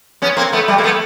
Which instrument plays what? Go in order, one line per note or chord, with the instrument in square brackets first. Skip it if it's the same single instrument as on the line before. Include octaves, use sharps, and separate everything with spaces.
[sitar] B3 C#4
A#3 C4
A3 B3
G3 A3
A#3
A3 B3